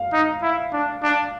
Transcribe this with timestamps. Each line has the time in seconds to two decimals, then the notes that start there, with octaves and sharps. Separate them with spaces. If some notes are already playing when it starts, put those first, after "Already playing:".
Already playing: F5
0.13 D#4
0.42 E4
0.73 D4
1.03 D4